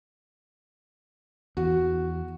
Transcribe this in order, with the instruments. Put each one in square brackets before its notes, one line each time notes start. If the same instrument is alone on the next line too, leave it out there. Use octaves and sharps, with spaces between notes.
[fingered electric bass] E2 [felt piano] F#4